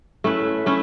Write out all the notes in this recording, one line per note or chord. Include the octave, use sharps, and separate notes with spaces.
A3 C#4 E4 B4
A3 C#4 E4